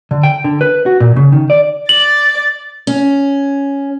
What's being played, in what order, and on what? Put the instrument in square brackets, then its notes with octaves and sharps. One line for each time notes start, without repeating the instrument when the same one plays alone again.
[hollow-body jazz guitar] D3
G5
D3
B4
F#4
A#2
C#3
D#3
D5
[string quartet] D5 A6 [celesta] F#7
[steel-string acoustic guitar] C#4